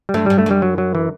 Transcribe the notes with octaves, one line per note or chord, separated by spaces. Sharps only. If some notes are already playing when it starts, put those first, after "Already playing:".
G3
G2 A3
G2 G3
A3
F#2 G3
F#3
F#3
E3